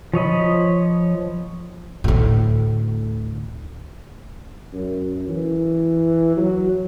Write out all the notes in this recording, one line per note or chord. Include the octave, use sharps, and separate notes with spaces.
F3 C#5 D#5 B5
D2 A2
F#2
E3
F#3